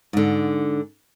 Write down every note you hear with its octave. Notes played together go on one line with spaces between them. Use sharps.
G#2 D3